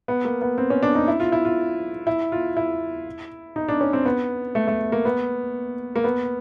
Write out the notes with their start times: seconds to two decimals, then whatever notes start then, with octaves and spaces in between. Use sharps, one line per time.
0.08 B3
0.25 A#3
0.42 B3
0.58 C4
0.70 C#4
0.83 D4
0.95 D#4
1.08 E4
1.20 F4
1.32 E4
1.45 F4
2.07 E4
2.32 F4
2.57 E4
3.56 D#4
3.68 D4
3.81 C#4
3.93 C4
4.05 B3
4.55 A3
4.68 A3
4.92 A#3
5.05 B3
5.96 A#3
6.04 B3